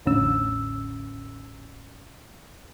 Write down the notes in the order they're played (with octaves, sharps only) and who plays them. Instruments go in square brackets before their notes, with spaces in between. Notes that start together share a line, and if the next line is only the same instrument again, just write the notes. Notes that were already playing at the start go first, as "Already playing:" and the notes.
[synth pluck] A1 E2 A2 D3 C#4 E6